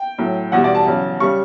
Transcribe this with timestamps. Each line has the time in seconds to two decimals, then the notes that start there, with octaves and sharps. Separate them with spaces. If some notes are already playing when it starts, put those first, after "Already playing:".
Already playing: G5
0.18 A2 F#3
0.52 E2 B2 G3 F#5
0.64 D5
0.75 A5
0.86 E2 C#3 F#3
1.20 C#3 G3 C#6